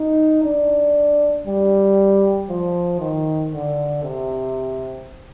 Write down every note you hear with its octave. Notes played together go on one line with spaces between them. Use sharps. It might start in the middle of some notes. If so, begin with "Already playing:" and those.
Already playing: D#4
D4
G3
F3
D#3
D3
C3